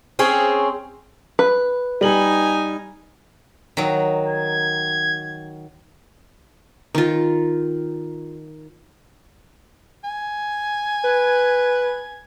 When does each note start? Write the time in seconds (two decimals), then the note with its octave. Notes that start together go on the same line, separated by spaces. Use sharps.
0.19 C4 C#4 G#4
1.39 B4
2.01 G3 D#4 G#5 F#7
3.77 D#3 F#3
4.28 G#6
6.95 D#3 F4
10.04 G#5
11.04 B4